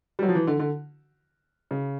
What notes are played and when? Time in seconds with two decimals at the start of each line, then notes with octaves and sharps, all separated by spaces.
0.19 G3
0.23 F#3
0.28 F3
0.35 E3
0.47 D3
0.59 D3
1.71 C#3